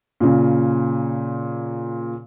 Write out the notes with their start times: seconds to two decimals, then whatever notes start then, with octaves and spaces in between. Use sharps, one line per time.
0.20 A#2 C#3